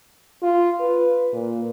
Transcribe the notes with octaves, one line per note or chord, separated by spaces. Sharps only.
F4
B4
A#2